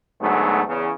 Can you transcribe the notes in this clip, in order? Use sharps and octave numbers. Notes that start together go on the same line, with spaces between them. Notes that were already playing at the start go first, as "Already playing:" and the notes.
D2 G#2 F#3 A3 B3
E2 C#3